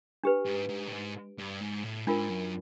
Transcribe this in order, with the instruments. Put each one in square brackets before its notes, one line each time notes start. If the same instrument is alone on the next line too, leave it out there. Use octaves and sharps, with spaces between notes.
[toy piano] D4 G4 B4
[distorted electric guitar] G#2
G#2
A2
G#2
G2
G#2
A2
[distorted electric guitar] G#2 [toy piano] D4 F4 A#4
[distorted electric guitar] F#2